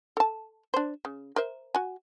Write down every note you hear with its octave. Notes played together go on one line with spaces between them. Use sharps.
A4 A5
D4 C5
C#3
A#4 C5 E5
F#4 G#5